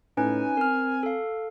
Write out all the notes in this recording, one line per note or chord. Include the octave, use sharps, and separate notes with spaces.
A2 C#4 D#4 B4 G#5
C4 A#4 F6
A4 F5